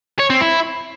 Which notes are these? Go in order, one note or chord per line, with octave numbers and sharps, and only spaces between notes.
C#5
C4
E4